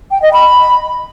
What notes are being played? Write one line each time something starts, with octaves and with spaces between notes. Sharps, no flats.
G5
D#5
B5